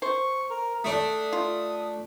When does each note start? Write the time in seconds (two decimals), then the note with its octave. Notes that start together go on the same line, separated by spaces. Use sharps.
0.02 C5 C#6
0.50 A#4
0.84 A3 D4 D#6
1.33 F4